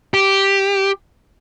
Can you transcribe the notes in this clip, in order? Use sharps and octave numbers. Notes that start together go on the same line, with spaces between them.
G4